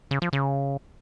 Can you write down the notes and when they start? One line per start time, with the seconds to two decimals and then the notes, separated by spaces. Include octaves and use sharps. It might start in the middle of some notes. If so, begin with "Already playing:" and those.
0.11 C#3
0.22 F3
0.33 C#3